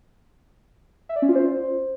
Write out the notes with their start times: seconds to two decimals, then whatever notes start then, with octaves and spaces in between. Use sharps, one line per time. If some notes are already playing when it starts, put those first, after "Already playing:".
1.09 E5
1.16 D5
1.22 C#4
1.29 F4
1.35 C5